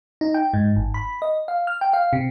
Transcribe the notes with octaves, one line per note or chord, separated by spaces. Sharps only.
D#4
G5
G#2
G#1
B5
D#5
F5
F6
G5
F5
C3